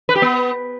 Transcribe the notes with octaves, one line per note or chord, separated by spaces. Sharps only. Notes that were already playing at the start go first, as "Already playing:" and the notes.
B4
G4
B3